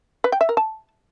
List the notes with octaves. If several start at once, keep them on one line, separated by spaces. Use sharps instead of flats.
B4
G5
E5
A#4
A5